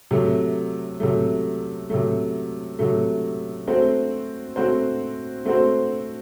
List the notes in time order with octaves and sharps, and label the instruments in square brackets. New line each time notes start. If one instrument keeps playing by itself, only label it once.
[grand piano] C3 F#3 A3
C3 F#3 A3
C3 F#3 A3
C3 F#3 A3
A3 C4 F#4 C5
A3 C4 F#4 C5
A3 C4 F#4 C5